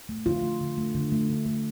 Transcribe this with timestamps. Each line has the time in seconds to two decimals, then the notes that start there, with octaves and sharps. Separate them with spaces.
0.09 A3
0.25 D3 F4
0.43 A3
0.61 D3
0.78 A3
0.95 D3
1.12 A3
1.29 D3
1.46 A3